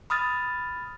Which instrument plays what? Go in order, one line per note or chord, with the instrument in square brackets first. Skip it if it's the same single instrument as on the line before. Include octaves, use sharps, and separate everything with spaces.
[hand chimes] B5 D#6 F6 A6